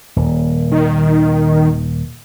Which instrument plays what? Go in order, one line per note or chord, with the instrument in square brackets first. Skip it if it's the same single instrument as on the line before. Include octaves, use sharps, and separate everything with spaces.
[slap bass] D#1
[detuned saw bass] D#3